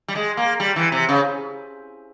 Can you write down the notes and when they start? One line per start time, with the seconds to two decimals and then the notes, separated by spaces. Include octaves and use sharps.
0.08 G3
0.15 G#3
0.37 A#3
0.60 G3
0.76 E3
0.92 C3
1.09 C#3